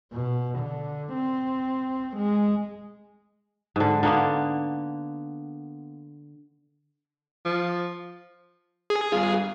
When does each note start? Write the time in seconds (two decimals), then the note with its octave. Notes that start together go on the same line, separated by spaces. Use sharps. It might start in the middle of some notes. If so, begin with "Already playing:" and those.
0.13 B2
0.59 D3
1.14 C4
2.17 G#3
3.76 G#2 D3
4.03 D3 A#3 B3
7.45 F3
8.90 G#4
9.12 G2 F4